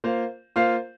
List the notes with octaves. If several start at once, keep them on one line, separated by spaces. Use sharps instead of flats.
A#3 F4 C5 F5
A#3 F4 C5 F5